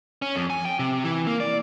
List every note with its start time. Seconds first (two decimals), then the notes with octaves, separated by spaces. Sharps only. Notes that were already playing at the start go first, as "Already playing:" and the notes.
0.22 C#4
0.36 F2
0.50 G#5
0.65 G5
0.79 C3
1.04 E3
1.27 A#3
1.40 D5